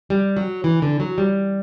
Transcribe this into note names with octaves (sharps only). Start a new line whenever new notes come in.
G3
F#3
E3
D3
F#3
G3